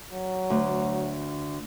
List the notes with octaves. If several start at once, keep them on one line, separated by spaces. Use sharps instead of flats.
F#3
D2